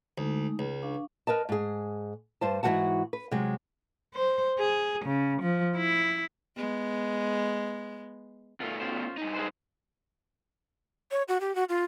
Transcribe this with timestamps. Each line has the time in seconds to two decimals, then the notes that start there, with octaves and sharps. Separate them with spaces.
0.18 D2 G#3 A3 D#4
0.59 C#2
0.83 D4 F5 C#6
1.27 A#4 B4 D#5 A5
1.49 G#2 G#4
2.41 G2 C5 A5
2.63 G#2 E3 F3 F#4 F#5 A5
3.13 B4
3.31 C3 F#3 G#3
4.15 C5
4.59 G#4
5.05 C#3
5.42 F3
5.76 E4
6.57 G#3 B3
8.60 B2 A3 F4
8.80 C#4 F4 C5
9.17 G2 D#4
9.34 G#4 B4 C5
11.11 C#5
11.28 F#4
11.41 G4
11.55 F#4
11.69 F4